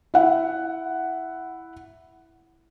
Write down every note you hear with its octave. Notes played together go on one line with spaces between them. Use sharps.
E4 F#5